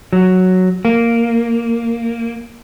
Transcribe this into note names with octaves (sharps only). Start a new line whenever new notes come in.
F#3
A#3